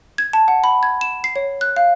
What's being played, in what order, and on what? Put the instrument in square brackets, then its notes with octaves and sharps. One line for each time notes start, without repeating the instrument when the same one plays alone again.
[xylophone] G#6
A5
F#5
B5
G#6
E7
C7
C#5
F#6
F5